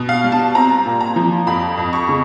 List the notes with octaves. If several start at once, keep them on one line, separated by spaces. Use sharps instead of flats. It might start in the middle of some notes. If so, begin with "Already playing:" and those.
Already playing: B2
F5
G3
A5
C4 A#5
A#2
A#5
F3
F2 B5
F2
C#6
C#3